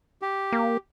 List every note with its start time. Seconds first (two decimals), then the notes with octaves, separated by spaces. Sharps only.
0.22 G4
0.52 A#3